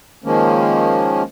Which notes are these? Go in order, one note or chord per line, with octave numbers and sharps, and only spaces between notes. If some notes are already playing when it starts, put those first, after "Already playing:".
D#3 F3 G#3 A#3 C#4